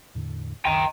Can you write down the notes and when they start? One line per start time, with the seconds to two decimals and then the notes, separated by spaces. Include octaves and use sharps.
0.15 E2 A2 D3
0.65 C#2 F#2 D#3 G5 A#5